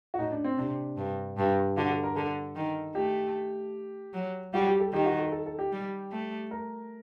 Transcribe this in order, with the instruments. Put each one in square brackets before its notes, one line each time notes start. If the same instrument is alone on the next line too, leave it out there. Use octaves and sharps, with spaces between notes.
[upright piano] F#4
[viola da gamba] A2 [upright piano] D#4
[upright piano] D4
C4
[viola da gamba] C3 [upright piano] D4
[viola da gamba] G2
G2
[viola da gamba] D3 [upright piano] F#4
[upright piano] A4
A#4
[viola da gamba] D3 [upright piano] A4
[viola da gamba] D#3
[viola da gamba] A3 [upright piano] G4
[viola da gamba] F#3
[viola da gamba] G3 [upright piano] F#4
[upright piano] G4
A4
[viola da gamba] D#3 [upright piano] G4
[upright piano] F#4
A4
A4
A4
G4
[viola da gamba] G3
A3
[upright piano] A#4